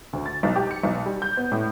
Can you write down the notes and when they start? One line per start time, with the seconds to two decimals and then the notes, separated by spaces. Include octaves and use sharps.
0.13 D2
0.26 A6
0.43 B1
0.56 G4
0.71 C#7
0.83 B1
1.06 G3
1.22 G6
1.37 B3
1.52 A2